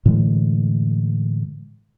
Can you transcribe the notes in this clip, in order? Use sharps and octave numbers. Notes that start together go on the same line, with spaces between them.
A2 D3 E3 G#3